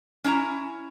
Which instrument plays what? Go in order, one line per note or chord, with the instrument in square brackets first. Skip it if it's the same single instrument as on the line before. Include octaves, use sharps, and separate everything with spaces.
[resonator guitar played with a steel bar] C#4 D4 E4 A#5